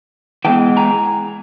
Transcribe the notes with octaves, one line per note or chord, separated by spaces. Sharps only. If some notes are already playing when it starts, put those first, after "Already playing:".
E3 G#3 B3 G5 A5
G#5 A#5